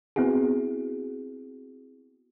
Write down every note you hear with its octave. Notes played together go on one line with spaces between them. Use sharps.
B3 C4 E4 F#4 G#4